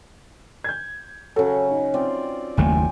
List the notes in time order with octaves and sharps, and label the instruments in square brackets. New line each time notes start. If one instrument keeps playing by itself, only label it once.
[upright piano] G6 G#6
[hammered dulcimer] C#3 F#3 [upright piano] A4
[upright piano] D#4
[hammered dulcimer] C4 F4 D5
[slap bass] F#1 D#2 A3 [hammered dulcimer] G5 G#5